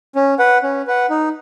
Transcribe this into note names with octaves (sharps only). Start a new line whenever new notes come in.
C#4
B4 F#5
C#4
B4 F#5
D#4